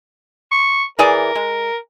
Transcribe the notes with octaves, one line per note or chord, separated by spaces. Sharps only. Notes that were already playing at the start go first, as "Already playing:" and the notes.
C#6
E3 G#4 A#4 D5
G#3